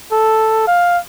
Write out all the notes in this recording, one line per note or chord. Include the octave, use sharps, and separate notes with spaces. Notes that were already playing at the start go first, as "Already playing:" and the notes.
A4
F5